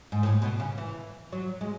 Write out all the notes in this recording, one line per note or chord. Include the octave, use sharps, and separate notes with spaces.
G#2
A2
B2
C#3
E3
F#3
G#3